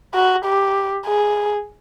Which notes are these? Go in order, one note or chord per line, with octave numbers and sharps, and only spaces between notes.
F#4
G4
G#4